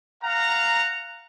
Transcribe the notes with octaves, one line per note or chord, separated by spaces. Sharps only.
F5 F#5 A#5